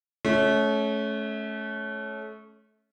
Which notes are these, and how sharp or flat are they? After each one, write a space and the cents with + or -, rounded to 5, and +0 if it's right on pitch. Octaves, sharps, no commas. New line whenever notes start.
A3 -30 C#4 +0